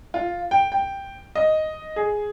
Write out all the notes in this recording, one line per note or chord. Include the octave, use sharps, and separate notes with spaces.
F4
G5
G5
D#5
G#4